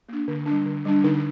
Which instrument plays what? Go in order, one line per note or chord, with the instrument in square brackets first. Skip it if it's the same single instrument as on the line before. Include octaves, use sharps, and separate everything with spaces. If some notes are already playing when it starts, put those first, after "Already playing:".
[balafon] A#3 D4
D3
G3 D4
D3
G3 D4
D3 D#4